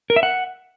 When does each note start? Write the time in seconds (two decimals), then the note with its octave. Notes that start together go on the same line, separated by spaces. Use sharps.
0.10 A#4
0.16 E5
0.23 F#5